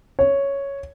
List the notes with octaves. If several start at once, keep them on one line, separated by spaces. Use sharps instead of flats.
C#5